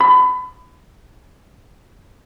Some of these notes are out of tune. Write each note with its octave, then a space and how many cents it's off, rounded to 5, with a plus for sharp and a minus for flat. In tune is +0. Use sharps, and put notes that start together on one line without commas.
B5 +30